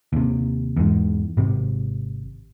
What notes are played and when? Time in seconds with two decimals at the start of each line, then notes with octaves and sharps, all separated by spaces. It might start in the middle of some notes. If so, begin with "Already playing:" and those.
0.13 D#2 C3
0.77 E2 G#2
1.37 G#1 C3